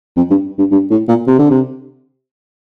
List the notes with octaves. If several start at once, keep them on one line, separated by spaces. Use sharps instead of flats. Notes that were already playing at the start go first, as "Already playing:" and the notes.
F2
G2
G2
G2
A2
A#2
C3
D3
C3